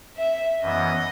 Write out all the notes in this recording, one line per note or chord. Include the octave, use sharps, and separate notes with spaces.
E5
F#2 E3 B3 D#5